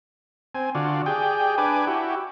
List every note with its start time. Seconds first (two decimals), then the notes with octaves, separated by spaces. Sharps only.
0.55 C4 G#5
0.75 D3 F4 F#4 D5
1.06 G4 G#4 D5 G5
1.58 D4 B4 G#5 D6
1.87 E4 F#4 G4